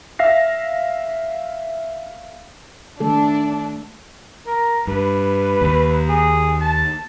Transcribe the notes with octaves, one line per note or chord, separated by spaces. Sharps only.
E5 F5 A#6 C7
D#3 A3 D4 A4
A#4
G2 B4
D#2
G#4
A5